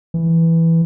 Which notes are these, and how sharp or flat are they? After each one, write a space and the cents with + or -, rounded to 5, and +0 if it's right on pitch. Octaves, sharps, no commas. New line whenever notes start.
E3 +0